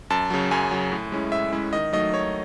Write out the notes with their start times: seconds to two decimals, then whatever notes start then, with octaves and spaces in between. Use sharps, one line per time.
0.10 F#2 A5
0.30 C#3 F#3
0.51 F#2 G#5
0.71 C#3 F#3
0.92 A2
1.12 G#3 C#4 E4
1.32 A2 E5
1.52 G#3 C#4 E4
1.73 D#3 D#5
1.93 F#3 A3 D#4 D#5
2.14 D#3 C#5